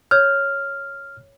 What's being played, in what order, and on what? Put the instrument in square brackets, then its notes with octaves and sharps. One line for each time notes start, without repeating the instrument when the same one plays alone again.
[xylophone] C#5 D#6 G6 [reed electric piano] F6